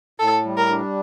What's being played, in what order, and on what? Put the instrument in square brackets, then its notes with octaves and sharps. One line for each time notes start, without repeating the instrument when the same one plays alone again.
[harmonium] A2 [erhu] A4
[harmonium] G3
[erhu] A#4
[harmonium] D4